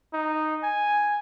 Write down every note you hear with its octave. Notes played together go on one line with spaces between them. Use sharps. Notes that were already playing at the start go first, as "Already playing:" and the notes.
D#4
G#5